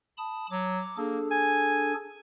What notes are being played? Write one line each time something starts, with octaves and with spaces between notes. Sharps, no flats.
A5 B5 D#6
F#3 D6
A#3 D4 G#4 A4
G#5